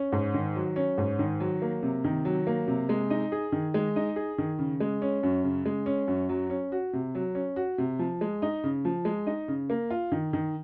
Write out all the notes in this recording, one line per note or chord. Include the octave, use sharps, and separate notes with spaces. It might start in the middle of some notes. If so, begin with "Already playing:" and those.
Already playing: C#4
G#2
D#3
F#3
C#4
G#2
D#3
F#3
A#3
C3
D#3
F#3
A#3
C3
G#3
D#4
G#4
D#3
G#3
D#4
G#4
D#3
C#3
G#3
C#4
F#2
C#3
G#3
C#4
F#2
F#3
C#4
F#4
C3
F#3
C#4
F#4
C3
F3
G#3
D#4
C#3
F3
G#3
D#4
C#3
A#3
F4
D#3
D#3